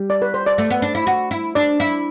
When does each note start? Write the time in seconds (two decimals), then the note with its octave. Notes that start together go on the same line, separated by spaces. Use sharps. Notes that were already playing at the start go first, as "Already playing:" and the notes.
Already playing: G3
0.10 D5
0.22 B4
0.34 C5
0.46 D5
0.58 A3
0.71 B3
0.82 D4
0.95 E4
1.07 F#4
1.31 E4
1.55 D4 D5
1.80 E4